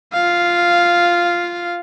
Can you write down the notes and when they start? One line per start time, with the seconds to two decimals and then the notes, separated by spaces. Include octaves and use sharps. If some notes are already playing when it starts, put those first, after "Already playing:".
0.13 F4 F5